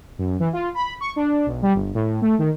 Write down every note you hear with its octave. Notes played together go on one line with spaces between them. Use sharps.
F#2
E3
F4
B5
C#6
D4
B1
G3
G1
A2
A3
D#3